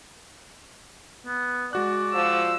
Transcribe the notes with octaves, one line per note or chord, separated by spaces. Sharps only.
B3
G#3 F#4 D5 F#6
F3 E6